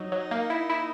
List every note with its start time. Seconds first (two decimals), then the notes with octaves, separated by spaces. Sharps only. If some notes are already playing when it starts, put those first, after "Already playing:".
Already playing: F#3 D#4
0.12 F#3
0.31 A#3
0.50 E4
0.70 E4